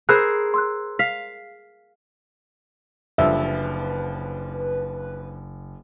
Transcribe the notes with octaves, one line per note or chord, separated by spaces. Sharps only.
G#4 A#4 C5 B5 E6 F#6
C6 E6 F#6
F5 B6
F#1 D3 F3 G3 B4 E5